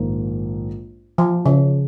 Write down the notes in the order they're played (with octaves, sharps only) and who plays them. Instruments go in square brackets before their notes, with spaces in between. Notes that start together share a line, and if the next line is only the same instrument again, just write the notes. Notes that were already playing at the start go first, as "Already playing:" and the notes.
Already playing: [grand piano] A#1 G#2 D#3 A#3
[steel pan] F3
C#3